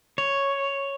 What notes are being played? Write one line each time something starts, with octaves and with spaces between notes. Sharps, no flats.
C#5